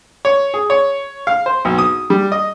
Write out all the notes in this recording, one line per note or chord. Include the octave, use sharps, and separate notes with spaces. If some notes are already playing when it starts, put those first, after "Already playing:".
C#5
G#4
C#5
F5
C5
B1
D#6
G3
D#5